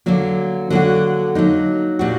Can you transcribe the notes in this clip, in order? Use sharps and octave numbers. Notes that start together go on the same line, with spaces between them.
D3 F#3 A#3
D3 F#3 A#3 D4 F#4
F#3 A#3 D#4
A#2 G3 D4 F#4